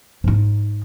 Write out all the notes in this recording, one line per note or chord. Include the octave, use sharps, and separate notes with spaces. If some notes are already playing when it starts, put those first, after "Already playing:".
G#2 D#4